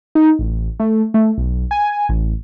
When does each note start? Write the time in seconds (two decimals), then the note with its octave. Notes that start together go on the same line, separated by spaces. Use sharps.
0.15 D#4
0.39 A1
0.80 A3
1.14 A3
1.38 B1
1.71 G#5
2.09 A1